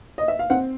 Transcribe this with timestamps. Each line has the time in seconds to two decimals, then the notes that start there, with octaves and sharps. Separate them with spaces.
0.18 D#5
0.28 E5
0.39 F5
0.50 C4 F#5